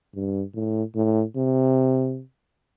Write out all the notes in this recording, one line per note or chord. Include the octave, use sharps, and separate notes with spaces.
G2
A2
A2
C3